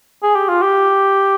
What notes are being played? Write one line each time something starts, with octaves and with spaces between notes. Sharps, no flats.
G#4
G4
F4
G4